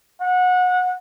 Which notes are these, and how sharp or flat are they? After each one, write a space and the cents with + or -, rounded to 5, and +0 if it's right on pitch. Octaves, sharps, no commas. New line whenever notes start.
F#5 -25